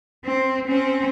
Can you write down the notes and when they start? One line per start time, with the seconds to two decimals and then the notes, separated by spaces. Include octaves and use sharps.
0.25 C4
0.67 C4 C#4